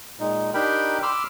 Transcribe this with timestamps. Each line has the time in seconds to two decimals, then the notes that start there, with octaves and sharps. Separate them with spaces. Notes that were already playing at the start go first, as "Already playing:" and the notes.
0.20 A#2 G#3 D#4
0.54 D4 D#4 G4 A#4 G5 B5
1.03 B5 C6 D6 E6 F6